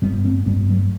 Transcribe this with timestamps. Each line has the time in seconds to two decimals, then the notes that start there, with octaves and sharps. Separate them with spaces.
0.02 G2 G3 B3
0.25 A3 C4
0.46 G2 G3 B3
0.69 F#3 A3